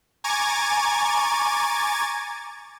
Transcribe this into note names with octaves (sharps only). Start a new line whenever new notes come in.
G#5 A#5 C#6 D6 G#6 A6